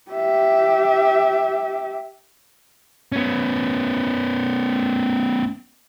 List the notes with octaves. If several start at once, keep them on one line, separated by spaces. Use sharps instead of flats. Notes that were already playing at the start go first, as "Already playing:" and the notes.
G4 E5
B3 C#4